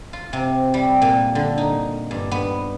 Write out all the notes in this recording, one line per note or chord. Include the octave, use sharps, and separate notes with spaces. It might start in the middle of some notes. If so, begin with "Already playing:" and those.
F4
C3
G3
A#2
D3
D#4
G2
B3